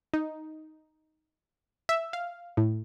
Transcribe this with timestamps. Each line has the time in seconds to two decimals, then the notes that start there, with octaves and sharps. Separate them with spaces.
0.14 D#4
1.89 E5
2.13 F5
2.57 A2